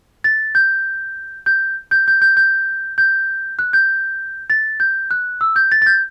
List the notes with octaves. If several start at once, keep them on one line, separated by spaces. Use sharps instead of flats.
A6
G6
G6
G6
G6
G6
G6
G6
F#6
G6
A6
G6
F#6
E6
G6
A6
A6
G6